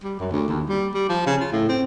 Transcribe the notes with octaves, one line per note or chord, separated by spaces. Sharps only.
G3
F#2
D2
D#2
G3
G3
F3
C#3
F4
A2
C4